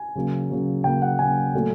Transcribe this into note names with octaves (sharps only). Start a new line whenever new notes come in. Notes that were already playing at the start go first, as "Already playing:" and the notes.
Already playing: G#5
C#3 F#3 A#3
C#3 F#3 A#3
C#3 F#3 A#3 G5
F#5
C#3 F#3 A#3 G#5
A#2 F#3 A3